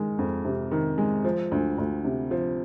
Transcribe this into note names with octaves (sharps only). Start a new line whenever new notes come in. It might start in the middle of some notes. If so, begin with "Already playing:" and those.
Already playing: D#3 G#3
F2
C3
D#3
G#3
F3
D2
D2
C3
F3